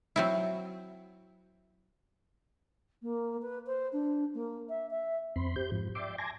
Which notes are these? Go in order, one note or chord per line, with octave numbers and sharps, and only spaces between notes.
F#3 C4 E4
A#3
B4
C5
D4
A#3
E5
E5
F2 C4 B5 C6
G4 C5 G6
G#2 F3
D5 E5 G5 C6 D6
G#5 A5 C6 D6 G#6 A#6